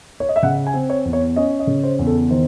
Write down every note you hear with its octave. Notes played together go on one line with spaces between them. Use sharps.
C#5
D#5
E5
C#3 F#5
G#5
C4
C#5
E2
C#5
C#4 D#5
D#5
C#3
C5
E2
A4
D#3 C5